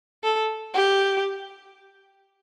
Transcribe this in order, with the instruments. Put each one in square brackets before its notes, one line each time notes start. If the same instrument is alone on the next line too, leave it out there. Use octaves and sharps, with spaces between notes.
[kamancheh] A4
G4